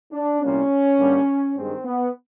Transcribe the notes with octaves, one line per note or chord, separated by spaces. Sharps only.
D4
C2 A#2 G3 A#3 C#4
G2 D3 G3 A#3
G2 D#3 G#3 C4
B3